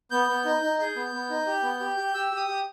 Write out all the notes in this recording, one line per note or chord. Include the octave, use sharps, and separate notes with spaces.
B3 G6
B3
D#4
D#4
G#4 G6
B3
B3
D#4
G4
B3
G4
G4
G4 E6
G4
D#6
G4